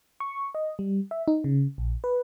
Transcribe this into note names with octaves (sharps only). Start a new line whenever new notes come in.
C#6
D#5
G3
E5
D#4
C#3
A#1
B4